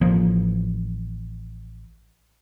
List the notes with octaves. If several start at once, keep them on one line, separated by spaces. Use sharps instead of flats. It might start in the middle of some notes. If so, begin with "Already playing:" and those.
A1 F3 A#3